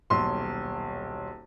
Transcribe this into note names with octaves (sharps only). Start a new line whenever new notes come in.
D#1 B1 C6